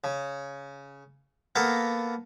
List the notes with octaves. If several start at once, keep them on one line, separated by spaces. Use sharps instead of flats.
C#3
A#3 B3 A4 F5 A#5